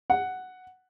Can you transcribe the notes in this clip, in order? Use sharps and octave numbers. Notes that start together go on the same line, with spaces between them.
F#5